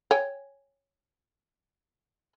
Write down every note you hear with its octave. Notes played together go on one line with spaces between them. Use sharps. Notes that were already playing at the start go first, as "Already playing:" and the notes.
C#5 G5 G#5